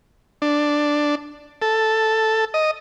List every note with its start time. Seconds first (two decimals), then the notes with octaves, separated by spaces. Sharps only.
0.42 D4
1.62 A4
2.54 D#5